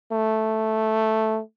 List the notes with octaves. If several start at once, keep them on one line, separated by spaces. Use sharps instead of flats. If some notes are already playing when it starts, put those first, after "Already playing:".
A3